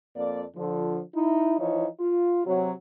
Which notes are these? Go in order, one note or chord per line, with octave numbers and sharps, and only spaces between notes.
F2 A#3 D5
D3 F3
D#4 E4
E3 F3 D#4 E4 C#5
F4
C3 F#3